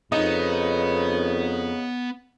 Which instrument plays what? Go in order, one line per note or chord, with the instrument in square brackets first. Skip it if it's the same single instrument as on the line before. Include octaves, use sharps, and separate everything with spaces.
[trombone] F2 [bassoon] C#3 [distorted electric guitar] B3 [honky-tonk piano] D#4